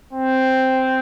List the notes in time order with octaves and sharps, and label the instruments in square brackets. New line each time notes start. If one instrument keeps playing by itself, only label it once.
[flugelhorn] C4